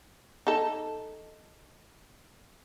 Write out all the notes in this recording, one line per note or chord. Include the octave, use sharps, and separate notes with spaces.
D#4 A4